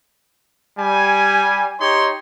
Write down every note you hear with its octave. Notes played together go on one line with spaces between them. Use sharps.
G3 G#5
D#4 G4 C#5 C6